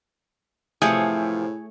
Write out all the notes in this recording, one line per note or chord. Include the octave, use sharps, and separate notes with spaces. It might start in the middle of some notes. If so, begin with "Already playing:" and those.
A2 C3 E3 F3 A3 G#4 C#5